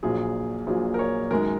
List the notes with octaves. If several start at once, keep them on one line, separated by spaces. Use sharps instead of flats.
A#1 A#2 F#3 G#4
A#1 A#2 F#3 G#4
A#4
C#5
F#2 D#3 G#3 A#4